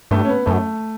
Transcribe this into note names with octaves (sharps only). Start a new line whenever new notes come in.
G2 A3
C#4
B3
F#2 A3